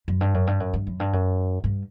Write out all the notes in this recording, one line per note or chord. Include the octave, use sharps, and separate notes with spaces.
F#2
G2
F#2
G2
F#2
G2
F#2
G2
F#2
G2